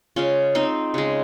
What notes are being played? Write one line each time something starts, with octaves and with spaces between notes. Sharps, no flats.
C#3 G#3 C#4 F4
C4 D#4
C#3 G#3